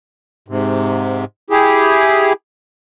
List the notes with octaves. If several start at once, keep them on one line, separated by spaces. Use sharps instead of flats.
G#2 C3
E4 G4 G#4